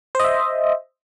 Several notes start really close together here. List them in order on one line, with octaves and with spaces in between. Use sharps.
C5 D#5 E5